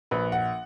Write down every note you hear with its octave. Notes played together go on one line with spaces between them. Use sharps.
A#1 B4
F#5